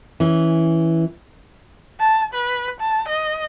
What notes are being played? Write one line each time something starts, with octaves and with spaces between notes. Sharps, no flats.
E3 C#4
A5
B4
A5
D#5